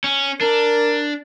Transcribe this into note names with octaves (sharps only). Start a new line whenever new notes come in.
C#4
D4 A#4